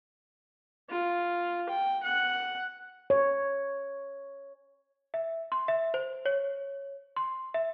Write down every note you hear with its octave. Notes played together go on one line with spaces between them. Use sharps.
F4
G5
F#5
C#5
E5
C6
E5
C5
C#5
C6
E5